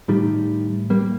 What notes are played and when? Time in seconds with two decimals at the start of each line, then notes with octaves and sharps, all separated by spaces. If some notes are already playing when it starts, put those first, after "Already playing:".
0.08 A2 D#3 G3
0.90 G3 A#3